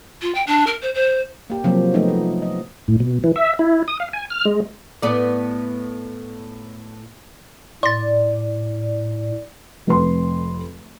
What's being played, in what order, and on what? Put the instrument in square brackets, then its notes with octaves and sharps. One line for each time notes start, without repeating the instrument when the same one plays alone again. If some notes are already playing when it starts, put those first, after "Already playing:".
[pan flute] F4
G5
D4
A#4
C5
C5
[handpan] A#3 G4
C3 F3 F#3 A#3 C4
F3 A3 B3 D#4
F3
D#5
[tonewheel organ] A2
B2
E3
E5
E4
D#6
F5
G#5
F6
G#3
[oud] A2 B3 D5
[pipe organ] A2 [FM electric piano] D5 [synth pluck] C6 A6
[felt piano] F1 F2 B4 C6